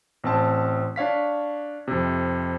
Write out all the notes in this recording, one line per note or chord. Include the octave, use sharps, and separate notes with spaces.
A1 C4 A5
D4 C#5 F5 B6
F2 C3